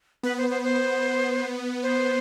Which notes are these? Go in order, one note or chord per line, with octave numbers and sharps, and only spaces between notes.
B3 B4
C5
C5
C5
C5